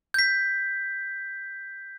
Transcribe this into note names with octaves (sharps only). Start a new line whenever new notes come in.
G6 B6